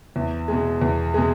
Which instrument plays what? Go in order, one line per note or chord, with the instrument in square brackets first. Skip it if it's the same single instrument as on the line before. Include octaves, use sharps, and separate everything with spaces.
[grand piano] E2
B2 G#3
E2
B2 G#3